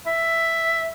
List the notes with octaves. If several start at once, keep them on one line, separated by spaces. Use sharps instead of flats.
E5